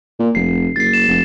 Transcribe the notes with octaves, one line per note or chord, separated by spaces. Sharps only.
A#2
F1 C7
F#1 A6 C7
E7
F1